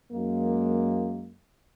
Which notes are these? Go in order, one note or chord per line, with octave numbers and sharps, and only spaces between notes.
F#2 G#3 A#3